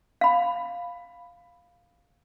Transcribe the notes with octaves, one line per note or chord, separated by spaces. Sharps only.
F5 B5